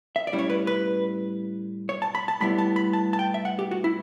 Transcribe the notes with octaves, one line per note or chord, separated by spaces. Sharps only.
E5
D5
A2 G3 C#4 E4
C#5
B4
B4
C#5
A5
B5
A5
A2 G3 B3 E4 B5
A5
B5
A5
A5
G5
E5
F#5
G4
F#4
E4